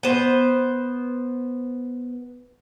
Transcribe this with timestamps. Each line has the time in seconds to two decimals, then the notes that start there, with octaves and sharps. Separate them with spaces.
0.03 B3 C5